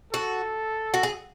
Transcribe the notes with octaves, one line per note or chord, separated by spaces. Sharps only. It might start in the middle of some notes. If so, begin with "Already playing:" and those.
F#4 A4
F#4
G#4